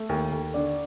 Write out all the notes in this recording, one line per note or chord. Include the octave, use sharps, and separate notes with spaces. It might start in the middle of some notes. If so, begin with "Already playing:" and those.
Already playing: A3 A4
D#2
D#2
D3 D5